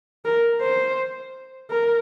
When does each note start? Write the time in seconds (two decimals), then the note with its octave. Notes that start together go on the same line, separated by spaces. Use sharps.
0.25 A#4
0.61 C5
1.70 A#4